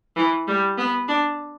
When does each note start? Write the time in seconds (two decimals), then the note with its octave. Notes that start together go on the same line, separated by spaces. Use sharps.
0.17 E3
0.48 G3
0.78 B3
1.08 D4